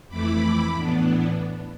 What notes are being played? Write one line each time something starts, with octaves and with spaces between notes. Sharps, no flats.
F2 E3 A3 E4 B5 D6
A2 E3 B3 D4